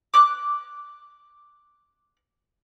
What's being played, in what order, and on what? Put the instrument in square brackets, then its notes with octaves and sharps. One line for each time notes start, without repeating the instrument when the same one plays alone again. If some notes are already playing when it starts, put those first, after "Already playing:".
[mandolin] D6 F#6